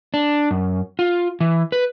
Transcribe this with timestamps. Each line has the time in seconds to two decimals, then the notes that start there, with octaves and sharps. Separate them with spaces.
0.14 D4
0.51 F#2
0.99 F4
1.41 E3
1.72 B4